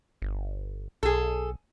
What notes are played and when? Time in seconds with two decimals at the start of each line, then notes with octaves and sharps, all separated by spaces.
0.22 G1
1.03 B1 G#4 A4